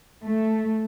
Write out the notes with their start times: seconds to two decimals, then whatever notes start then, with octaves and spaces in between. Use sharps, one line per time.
0.23 A3